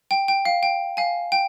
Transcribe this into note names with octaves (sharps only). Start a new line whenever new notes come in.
G5
G5
F5
G5
F5 G#5
G5